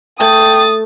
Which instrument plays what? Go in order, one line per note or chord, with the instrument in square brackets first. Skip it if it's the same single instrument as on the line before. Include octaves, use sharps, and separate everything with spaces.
[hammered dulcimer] A3 [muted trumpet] G5 [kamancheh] D#6 [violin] A6